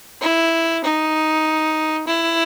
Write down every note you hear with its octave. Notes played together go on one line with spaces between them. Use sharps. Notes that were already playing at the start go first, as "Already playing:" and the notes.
E4
D#4
E4